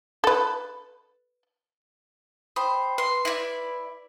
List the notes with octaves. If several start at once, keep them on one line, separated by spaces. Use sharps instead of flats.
A4 B4
C5 G5 B5 D#6
B4 C6
E4 D5